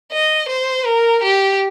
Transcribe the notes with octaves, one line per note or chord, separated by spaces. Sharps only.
D#5
C5
A#4
G4